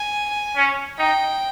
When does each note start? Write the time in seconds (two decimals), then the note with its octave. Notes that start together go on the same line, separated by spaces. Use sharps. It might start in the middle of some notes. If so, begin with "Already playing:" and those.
Already playing: G#5
0.56 C#4
0.99 D#4 G5